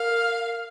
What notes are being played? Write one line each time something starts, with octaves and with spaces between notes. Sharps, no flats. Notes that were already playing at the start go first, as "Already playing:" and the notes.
Already playing: A#4 F5